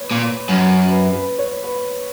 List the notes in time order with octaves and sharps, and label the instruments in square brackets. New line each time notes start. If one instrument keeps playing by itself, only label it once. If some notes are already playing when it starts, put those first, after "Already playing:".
Already playing: [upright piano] B4 C#5
[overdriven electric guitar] A#2
F#2
[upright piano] B4
B4
C#5
B4